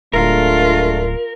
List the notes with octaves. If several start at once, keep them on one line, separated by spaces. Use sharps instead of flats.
D1 G#3 A3 D4 F4 A#4